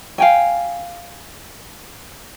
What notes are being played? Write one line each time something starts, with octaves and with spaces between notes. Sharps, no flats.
F5 G5 G#5